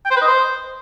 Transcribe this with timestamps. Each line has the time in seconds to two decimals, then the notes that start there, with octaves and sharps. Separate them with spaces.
0.05 G5
0.11 C5
0.16 B4
0.22 D#5
0.27 C5